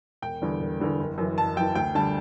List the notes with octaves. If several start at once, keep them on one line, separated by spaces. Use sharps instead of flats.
E1 G5
E2 D3 G3
E1
E2 D3 G3
F#1
F#2 E3
F#1 A5
F#2 E3 G5
D2 G5
D3 G3 A5